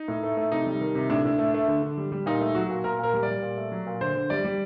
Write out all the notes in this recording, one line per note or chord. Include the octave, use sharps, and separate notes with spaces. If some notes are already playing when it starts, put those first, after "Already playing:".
Already playing: D#4
A2
A3
A3
C3 D#4
G3
D#3
C3
A2 D4
A2
A3
A3
D3
D3
G3
G3
A#2 D#4
A3
F#3 F#4
A#2
A#2 A#4
A#2 A#4
G3
D5
G3
A#2
A3
F#3
A#2
D3 C5
D3
G3 D5
G3